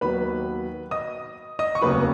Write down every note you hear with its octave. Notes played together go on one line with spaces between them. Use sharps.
D#2 D#3 F#3 B3 B4 B5
D#5 D#6
D#5 D#6
C#6
F1 D#2 C#3 F#3 B4 B5